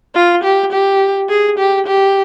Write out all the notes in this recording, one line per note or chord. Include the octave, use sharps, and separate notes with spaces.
F4
G4
G4
G#4
G4
G4